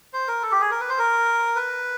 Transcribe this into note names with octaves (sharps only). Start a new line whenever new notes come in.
C5
A#4
A4
G4
G#4
A#4
B4
C5
A#4
B4